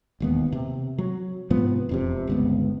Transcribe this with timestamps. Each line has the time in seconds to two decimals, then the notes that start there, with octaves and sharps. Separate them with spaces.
0.20 E1 D#2 B3
0.52 C3
0.98 F#3
1.50 G#2 C3 F3 B3
1.89 E1 F2 C3
2.27 G1 C#2 B3